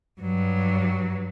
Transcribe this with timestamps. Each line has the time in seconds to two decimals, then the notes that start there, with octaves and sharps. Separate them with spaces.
0.21 G2 F#3